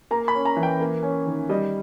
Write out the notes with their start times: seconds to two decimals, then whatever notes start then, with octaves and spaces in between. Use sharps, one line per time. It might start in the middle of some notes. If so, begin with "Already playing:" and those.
0.11 A#3 A#5
0.28 B5
0.34 C#4
0.45 A#5
0.57 E3
0.63 G5
0.80 A#3
1.03 C#4
1.26 D#3
1.49 G3 D#5